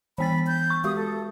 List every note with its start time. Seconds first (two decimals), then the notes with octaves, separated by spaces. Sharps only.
0.18 E3 B3 B5 A6
0.47 G6
0.70 C#6
0.84 G#3 F#4 G4 D#6
0.96 A4